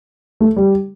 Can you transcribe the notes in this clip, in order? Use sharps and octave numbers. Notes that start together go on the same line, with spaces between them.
A3
G3